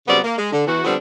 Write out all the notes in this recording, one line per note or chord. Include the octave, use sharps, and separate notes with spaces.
C#3 F#3 G3 B3 C4 D5
A#3
G#3
D3
E2 E3 F#4
D3 F3 G3 B3 C4 D4